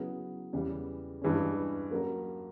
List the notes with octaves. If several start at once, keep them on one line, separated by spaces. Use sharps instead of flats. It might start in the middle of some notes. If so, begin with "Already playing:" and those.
Already playing: C#3 F#3 B3 E4 G#4
E2 C#3 E3 G3
G2 E3 G#3 C#4
F#3 A#3 C#4 F#4 A#4